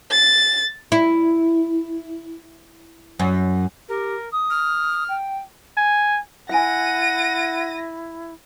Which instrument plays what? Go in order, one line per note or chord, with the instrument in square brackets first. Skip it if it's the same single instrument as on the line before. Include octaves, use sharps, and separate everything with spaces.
[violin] A6
[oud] E4
F#2
[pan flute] G4 [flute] A#4
[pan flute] D#6
[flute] F6
[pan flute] G5
[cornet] G#5
[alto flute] E4 [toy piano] E5 G#5 [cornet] F#5 [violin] A#6 D#7